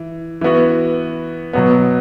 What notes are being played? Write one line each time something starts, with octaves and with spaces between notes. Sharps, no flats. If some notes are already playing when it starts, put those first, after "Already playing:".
Already playing: E3
E3 B3 F#4
B2 F#3 B3